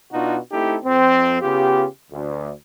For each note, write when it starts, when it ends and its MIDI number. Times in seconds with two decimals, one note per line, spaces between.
0.12 0.37 47
0.12 0.37 62
0.12 0.37 63
0.12 0.37 65
0.12 0.37 66
0.52 0.77 57
0.52 0.77 60
0.52 0.77 63
0.52 0.77 64
0.52 0.77 67
0.52 0.77 69
0.84 1.41 41
0.84 1.41 60
1.42 1.85 49
1.42 1.85 59
1.42 1.85 65
1.42 1.85 67
2.11 2.52 38